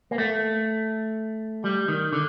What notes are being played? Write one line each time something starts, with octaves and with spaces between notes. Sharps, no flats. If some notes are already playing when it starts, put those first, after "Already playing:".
A#3
A3
G3
D#3
D3